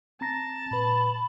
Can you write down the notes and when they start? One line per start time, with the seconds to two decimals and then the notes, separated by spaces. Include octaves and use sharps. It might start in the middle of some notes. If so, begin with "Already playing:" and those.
0.21 C4 A5 A#5 A#6
0.71 A#2 B4 B5